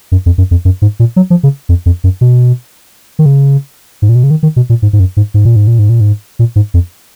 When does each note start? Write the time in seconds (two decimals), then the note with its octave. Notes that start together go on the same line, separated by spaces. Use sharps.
0.12 F#2
0.26 F2
0.38 F#2
0.51 F2
0.65 F#2
0.82 G#2
1.00 A#2
1.16 F#3
1.30 F3
1.43 C#3
1.69 F2
1.86 F2
2.04 F#2
2.21 B2
3.19 D#3
3.26 C#3
4.02 G#2
4.09 A#2
4.15 B2
4.23 C#3
4.31 D#3
4.43 D#3
4.56 B2
4.70 A#2
4.82 G#2
4.93 G#2
5.00 F#2
5.17 G#2
5.34 G#2
5.45 A#2
5.56 G#2
5.67 A#2
5.79 G#2
5.89 A#2
6.01 G#2
6.39 A#2
6.56 G#2
6.74 F2